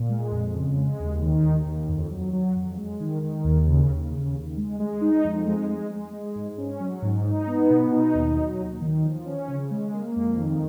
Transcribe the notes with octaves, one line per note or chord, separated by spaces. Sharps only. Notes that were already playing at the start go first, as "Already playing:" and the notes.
Already playing: A#2
G#3
F2
C#3
G#3
D#2
D#3
D#2
D#2
F2
F#3
F#3
F2
G#3
D#3
D#3
D#2
C#3
D#2
C#3
D#2
G#3
G#3
D#4
F2
G#3
G#3
G#3
G#3
G#2
C#4
F#3
G#2
D#4
B3
B2
D#4
D#2
F#3
D#2
D#3
F3
C#4
C#3
G#3
A#3
F2
D#3